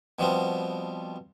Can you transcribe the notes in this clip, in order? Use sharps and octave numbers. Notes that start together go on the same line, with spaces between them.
B2 F3 G3 B3 C4